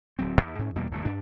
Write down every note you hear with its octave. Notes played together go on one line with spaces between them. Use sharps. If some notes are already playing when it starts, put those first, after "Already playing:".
D1 F#3 C4
D#2
G#2 C#4
E2 B2 G3 A#3
F#1 D#2 A2 A3
G2 D4